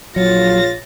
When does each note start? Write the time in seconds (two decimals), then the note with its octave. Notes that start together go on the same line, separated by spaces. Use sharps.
0.16 A#1 F#3 F4 C#5 A6 A#6